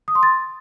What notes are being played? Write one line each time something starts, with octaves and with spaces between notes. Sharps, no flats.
D#6
C6
A6